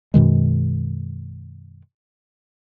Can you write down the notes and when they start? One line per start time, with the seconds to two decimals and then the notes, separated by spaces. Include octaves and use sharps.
0.14 F#2 B2 D#3 G#3